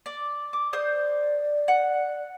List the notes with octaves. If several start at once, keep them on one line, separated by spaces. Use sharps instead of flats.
D5
D6
C5 D5 D#6 G6
F#5